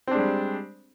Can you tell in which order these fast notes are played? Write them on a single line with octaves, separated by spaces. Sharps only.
C4 D4 G#3 G3